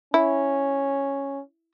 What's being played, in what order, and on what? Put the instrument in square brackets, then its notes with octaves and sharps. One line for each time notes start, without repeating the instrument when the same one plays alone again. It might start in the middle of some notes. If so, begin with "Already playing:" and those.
[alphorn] C#4 [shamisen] E4